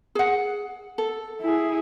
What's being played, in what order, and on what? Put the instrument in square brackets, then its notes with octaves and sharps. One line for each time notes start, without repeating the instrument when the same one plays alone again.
[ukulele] G#4 F#5
A4
[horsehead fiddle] E4 G#4